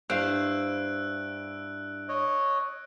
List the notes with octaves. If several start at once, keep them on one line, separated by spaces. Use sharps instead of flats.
G2 E4 C5 F5 E6 F#6 D7
C#5 D#5